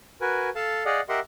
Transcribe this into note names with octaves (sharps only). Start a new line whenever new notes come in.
F#4 A#4 B4 G#5
A4 F5 A5
G#4 D5 D#5 F5 F#5
G4 A#4 D#5 E5 F#5 C6